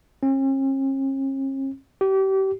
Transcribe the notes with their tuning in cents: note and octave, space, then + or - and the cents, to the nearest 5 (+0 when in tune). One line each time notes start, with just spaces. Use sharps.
C#4 -45
G4 -30